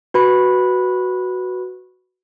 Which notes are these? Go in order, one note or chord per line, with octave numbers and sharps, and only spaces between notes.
F#4 B4 B5